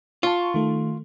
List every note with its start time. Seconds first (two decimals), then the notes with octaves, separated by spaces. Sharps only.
0.23 F4 A5 C#6
0.54 D#3 A3